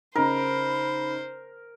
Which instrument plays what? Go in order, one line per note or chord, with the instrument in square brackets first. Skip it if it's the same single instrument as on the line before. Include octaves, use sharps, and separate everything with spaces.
[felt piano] C#3 D#4 [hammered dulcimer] A#4 [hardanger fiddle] C5 [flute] B5